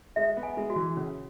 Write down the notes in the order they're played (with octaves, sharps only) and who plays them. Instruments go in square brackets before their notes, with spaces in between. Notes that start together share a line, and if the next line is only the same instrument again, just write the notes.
[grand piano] G#3 [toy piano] E5
[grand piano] B3
[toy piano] G#5
[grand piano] G#3
[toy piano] F#4
[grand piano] E3
[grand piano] C#3 [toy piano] C#4